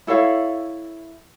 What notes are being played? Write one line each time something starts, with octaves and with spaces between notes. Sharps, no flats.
E4 A4 C#5 F5